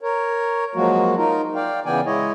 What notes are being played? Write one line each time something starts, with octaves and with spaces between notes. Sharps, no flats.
A#4 C#5
F3 F#3 G#3 A#3 F#4
D#4 F4 A#4
D5 F5 G5
C#3 E3 B3 D5 G5 G#5
G#3 E4 C#5 D#5